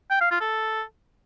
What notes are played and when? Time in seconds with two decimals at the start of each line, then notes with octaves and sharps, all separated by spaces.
0.11 G5
0.21 F5
0.31 F4
0.41 A4